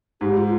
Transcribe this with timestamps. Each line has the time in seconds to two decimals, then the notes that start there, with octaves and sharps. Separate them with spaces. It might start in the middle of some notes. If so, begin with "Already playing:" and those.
0.21 G#2 G4
0.37 F4